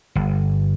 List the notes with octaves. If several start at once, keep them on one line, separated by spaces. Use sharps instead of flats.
G1